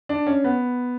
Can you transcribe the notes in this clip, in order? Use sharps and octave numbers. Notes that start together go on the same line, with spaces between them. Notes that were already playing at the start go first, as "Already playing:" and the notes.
D4
C#4
B3